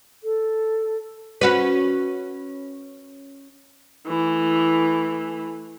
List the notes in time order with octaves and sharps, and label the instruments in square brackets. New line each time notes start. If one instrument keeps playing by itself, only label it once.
[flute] A4
[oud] C#4 F#4 B4
[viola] E3 A3